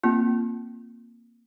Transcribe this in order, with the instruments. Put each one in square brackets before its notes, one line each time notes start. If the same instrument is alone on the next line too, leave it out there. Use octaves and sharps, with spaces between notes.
[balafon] A#3 C4 F4